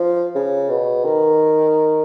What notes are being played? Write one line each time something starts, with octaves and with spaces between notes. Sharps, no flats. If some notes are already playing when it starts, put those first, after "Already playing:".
Already playing: F3
C#3
B2
D#3